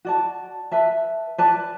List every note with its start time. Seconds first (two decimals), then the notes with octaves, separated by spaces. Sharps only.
0.05 F#4 D5 A5
0.71 B4 E5 A5
1.38 B4 D5 A5